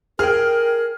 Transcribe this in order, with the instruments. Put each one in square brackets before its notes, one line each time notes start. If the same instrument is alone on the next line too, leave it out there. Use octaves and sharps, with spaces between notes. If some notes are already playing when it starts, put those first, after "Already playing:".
[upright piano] G#4 [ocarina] A#4 [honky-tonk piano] G5 F6